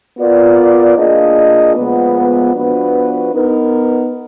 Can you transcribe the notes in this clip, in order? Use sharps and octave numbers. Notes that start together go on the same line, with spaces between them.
B3 F4 A#4 D5
A#3 D4 F4 G#4 D#5
A#2 F3 G#3 B3
F3 B3 D4 F#4 B4
B3 D#4 A#4